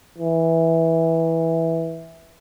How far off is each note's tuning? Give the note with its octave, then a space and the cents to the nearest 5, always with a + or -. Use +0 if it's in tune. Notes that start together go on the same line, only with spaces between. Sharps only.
E3 -10